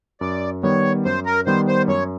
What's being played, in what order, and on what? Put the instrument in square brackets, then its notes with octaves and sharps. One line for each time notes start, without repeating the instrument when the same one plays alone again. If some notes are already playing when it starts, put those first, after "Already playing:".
[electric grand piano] F#2 [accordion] D5
[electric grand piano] D#3 G3 B3 [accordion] C#5
[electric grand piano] F#2 [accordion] C5
[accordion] A#4
[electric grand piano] D#3 G3 B3 [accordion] C5
[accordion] C5
[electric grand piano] F#2 [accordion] C#5